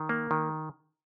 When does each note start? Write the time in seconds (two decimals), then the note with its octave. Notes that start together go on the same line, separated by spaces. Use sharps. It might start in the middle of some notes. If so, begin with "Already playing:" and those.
Already playing: D#3
0.09 A#3
0.31 D#3